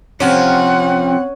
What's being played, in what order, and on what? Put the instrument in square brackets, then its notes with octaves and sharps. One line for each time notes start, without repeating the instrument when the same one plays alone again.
[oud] C3 F3 [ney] C4 [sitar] C#4 [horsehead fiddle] F#5